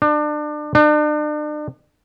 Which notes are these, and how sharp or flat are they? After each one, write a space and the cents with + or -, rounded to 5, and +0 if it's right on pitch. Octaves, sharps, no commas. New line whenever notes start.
D4 +30
D4 +40